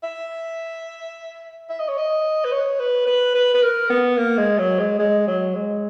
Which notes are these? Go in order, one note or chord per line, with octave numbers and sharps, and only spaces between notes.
E5
E5
D#5
C#5
D#5
B4
C#5
B4
B4
B4
B4
A#4
B3
A#3
G#3
F#3
G#3
G#3
F#3
G#3